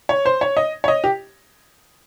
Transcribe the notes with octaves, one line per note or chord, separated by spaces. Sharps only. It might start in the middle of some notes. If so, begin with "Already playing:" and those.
C#5
C5
C#5
D#5
C#5
D#5
G4